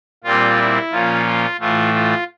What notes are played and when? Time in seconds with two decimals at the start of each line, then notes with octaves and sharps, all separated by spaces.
0.24 A#2 G3 C4 F4
0.59 E4
0.91 A#2 F3 A#3 C#4 F4
1.25 F4
1.60 A2 E3 A3 F4
1.93 F4